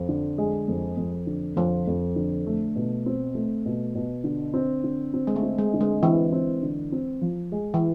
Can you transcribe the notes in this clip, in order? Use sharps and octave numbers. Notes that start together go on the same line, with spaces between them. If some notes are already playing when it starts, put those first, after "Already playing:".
Already playing: F2 F3
D3
G#3
F2
F2
D3
F2 F3
F2
D3
A3
B2
C4
A3
B2
B2
D3
C4
D3
C4
G#3
A3
C4
G#3
D3
G#3
E3 C4
C4
D3
C4
F3
G#3
E3